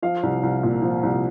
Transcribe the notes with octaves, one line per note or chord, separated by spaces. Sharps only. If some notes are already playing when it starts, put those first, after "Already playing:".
F3 F5
C2
C2
A#2
F3
C2